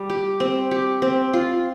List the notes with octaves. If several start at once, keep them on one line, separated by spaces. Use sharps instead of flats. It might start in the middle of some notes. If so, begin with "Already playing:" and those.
Already playing: G3
G4
C4
G4
C4
F4